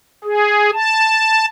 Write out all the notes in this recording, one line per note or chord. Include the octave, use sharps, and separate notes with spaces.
G#4
A5